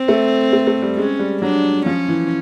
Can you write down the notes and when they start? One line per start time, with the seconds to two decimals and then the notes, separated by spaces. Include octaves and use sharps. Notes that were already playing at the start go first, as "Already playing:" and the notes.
Already playing: C4
0.08 A3
0.53 A3
0.67 A3
0.82 G3
0.97 G#3 C#4
1.19 G3
1.42 F#3 D4
1.86 F3 C#4
2.08 E3